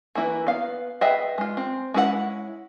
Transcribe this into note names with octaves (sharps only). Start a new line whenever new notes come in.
E3 A#3 E4 B4
B3 F5
G#4 B4 D#5 E5 G5
G#3 F4
C4
G#3 C#4 E4 A4 F#5